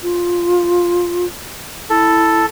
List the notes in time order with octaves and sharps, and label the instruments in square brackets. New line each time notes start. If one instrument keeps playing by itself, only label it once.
[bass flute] F4
[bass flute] E4 [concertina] A4